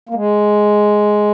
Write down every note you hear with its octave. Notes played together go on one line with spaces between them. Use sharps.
A#3
G#3